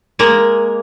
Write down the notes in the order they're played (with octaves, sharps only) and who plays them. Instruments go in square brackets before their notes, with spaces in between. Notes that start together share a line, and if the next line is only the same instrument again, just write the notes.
[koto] G#3 A#3